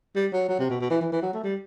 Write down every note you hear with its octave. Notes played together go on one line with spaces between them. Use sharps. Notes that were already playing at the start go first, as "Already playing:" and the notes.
G3
F#3
F#3
C3
B2
B2
E3
E3
E3
F#3
A3
G3